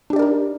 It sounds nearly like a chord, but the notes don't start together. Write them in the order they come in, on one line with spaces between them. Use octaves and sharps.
D4 G4 D5 A#4 D#4